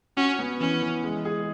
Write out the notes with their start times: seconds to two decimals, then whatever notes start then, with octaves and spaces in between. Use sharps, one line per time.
0.17 C#4 F#4
0.39 B3
0.60 E3 C#4
0.82 E3
1.04 G#3
1.25 G#4